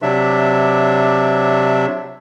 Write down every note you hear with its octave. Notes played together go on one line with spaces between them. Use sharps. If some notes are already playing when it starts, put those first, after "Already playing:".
C3 F#3 D4 E5